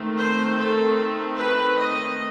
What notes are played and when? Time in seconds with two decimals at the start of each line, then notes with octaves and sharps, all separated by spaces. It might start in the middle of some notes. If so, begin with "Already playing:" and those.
Already playing: D#3 A3 C4
0.16 C5
0.57 A4
1.38 B4
1.79 D#5